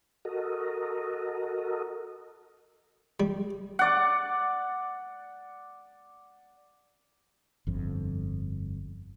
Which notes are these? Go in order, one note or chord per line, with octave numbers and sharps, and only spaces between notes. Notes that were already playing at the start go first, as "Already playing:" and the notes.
F#4 A4 A#4 D#5
G3
D5 F#5
G1 F2